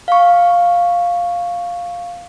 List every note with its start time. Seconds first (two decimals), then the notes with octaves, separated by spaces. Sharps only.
0.08 F5 C#6